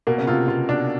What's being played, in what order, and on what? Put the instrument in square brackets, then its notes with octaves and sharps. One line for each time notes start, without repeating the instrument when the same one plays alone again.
[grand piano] B2 [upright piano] A#3
[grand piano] C#3
[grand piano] C3 [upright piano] F4
[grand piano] B2 [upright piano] F4
[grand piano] B2 [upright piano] D4